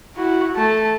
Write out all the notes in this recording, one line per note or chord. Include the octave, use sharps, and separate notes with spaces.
E4 F#4
A3 A5